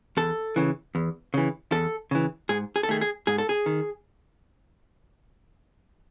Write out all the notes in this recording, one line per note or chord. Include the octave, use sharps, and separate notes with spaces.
E2 A4
C#3 E3
E2
C#3 E3
E2 A4
C#3 E3
G#2 G#4
G#4
A4
D#3 A3 G#4
G#4
G#2 G#4
A4
G#4
D#3